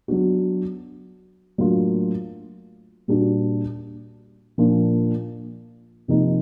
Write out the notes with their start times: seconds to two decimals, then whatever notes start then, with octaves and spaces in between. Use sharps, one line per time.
0.08 F#3 B3 D4 F#4
1.58 A2 F#3 A#3 D4 F4
3.08 A#2 G3 A#3 D4 F#4
4.58 A#2 F3 A#3 D4 F4
6.08 C3 F3 A#3 D#4